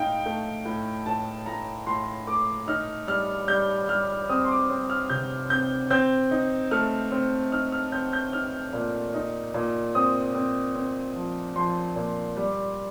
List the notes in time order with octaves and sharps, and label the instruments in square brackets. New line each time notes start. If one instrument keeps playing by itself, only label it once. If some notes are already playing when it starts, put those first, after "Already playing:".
Already playing: [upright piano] A2 D#4 F5 G5
A3
A2
A2 A5
A2 A#5
A2 C6
A3 D6
D#4 F6
G3 F6
G3 G6
G3 F6
C4 D#6
C6
D6
C4
F6
C3 G6
C4 G6
C4 G6
D#4
A3 F6
C4
D#4 F6
F6
C4 G6
G6
D#4 F6
A#2
D#4
A#2
C4 D#6
C4
C4
F3
F3 C6
A#2
G3